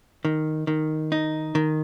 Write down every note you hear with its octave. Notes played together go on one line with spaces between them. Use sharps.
D#3
D#3
D#4
D#3